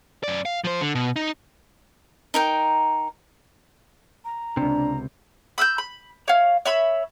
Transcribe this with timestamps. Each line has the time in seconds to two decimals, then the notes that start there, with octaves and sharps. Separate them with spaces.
0.24 F#2 D5
0.46 F5
0.64 F3 C5
0.81 D3
0.95 B2
1.16 D#4
2.34 D#4 A#4 G5
4.25 A#5
4.57 C#2 C3 D4
5.58 B5 E6 F#6 G6
5.78 B5
6.28 C#5 F5
6.66 C#5 E5 B5 E6